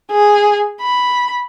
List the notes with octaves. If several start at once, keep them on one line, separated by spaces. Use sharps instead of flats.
G#4
B5